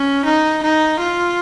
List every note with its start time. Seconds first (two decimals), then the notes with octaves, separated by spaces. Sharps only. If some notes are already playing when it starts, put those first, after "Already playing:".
Already playing: C#4
0.25 D#4
0.62 D#4
1.00 F4